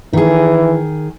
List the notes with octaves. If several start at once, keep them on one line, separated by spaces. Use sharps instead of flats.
D#3 E3 G#4